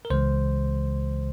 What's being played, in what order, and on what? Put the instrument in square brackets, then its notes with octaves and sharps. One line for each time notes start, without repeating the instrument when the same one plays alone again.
[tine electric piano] A#4
C#2 C#3 E3 G#3 C5